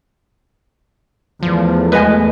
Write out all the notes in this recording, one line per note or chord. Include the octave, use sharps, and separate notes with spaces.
E2 F3 A3
G#3 B4 D#5 G#5